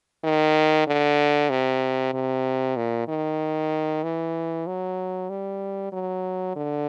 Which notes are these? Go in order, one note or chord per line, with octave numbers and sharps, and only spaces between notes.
D#3
D3
C3
C3
A#2
D#3
E3
F#3
G3
F#3
D3